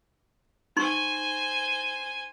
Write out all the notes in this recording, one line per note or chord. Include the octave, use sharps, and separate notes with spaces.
D#4 C5 G#5 C6 C#6